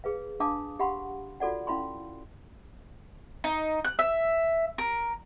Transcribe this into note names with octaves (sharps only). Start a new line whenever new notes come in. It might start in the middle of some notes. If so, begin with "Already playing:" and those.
G#4 B4 F5
D4 F5 A5 D6 D#6
G4 F5 F#5 B5 C6
F4 F#4 A4 D5 F#5
C#4 E4 F5 B5 C6
D#4
F#6
E5
A#4